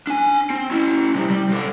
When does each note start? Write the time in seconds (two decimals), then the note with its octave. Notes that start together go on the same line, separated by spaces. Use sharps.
0.07 D4 G#5
0.50 C4
0.71 C#4 E4
1.15 C3 G3
1.30 G3
1.49 C3 A4